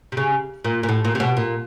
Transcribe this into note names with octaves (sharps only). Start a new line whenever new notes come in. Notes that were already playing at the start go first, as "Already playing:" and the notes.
C3
C#3
A#2
A#2
A2
A#2
C3
B2
A#2